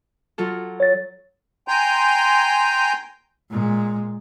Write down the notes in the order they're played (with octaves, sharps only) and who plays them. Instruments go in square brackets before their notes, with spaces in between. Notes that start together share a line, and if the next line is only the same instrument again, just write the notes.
[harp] F#3 F4 A4
[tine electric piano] C#5 A6
[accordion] G5 G#5 A#5 C6 G6
[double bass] A#2 G#3